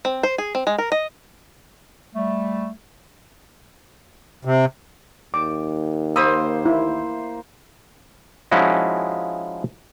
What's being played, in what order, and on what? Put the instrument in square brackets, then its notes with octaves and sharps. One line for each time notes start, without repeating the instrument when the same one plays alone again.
[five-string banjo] C4
C5
G#4
C4
G#3
A#4
D#5
[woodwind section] G3 A3
[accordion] C3
[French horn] D#2 [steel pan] D6
[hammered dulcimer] A#3 C5 [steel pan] B5 D#6 E6
[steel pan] E4
[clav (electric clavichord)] F3 G#3 C#4 D#4 E4 F#4